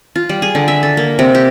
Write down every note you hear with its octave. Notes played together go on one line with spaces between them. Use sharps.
F4
G3
G#4
D3
E5
A4
A#3
C3
G4